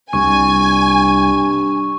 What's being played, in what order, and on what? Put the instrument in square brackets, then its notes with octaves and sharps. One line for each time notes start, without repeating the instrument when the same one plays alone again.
[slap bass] C2 [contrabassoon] G2 [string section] G#5 [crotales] C#6